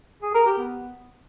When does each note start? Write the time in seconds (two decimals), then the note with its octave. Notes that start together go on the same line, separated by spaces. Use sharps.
0.23 G#4
0.34 A#4
0.46 G4
0.58 B3